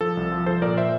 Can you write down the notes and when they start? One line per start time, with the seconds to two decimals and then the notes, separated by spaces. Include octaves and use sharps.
0.01 F3 A4
0.17 C2
0.32 F3
0.46 F3 A4 C5
0.62 A#2 A#4 D5
0.77 C5 E5